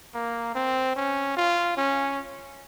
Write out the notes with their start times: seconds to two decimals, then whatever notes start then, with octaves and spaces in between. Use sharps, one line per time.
0.14 A#3
0.55 C4
0.96 C#4
1.36 F4
1.77 C#4